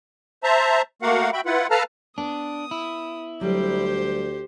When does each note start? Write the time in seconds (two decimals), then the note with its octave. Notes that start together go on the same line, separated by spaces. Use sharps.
0.43 C5 E5 A5 A#5
1.02 A3 A#3 F#4 A#4 F5 F#5
1.33 F#4 E5 G5 B5
1.46 E4 F4 B4 F#5
1.70 A4 B4 F5 A5 A#5 F6
2.18 B3 D4 D#6
2.71 E4
3.41 D2 F#3 G3 G4 C5